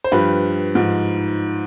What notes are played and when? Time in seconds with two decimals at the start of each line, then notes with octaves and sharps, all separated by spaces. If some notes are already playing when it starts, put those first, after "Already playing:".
0.04 C5
0.12 G2 F3 G4 B4
0.75 G#2 F3